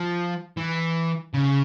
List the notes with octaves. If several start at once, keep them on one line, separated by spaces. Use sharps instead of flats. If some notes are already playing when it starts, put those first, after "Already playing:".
Already playing: F3
E3
C#3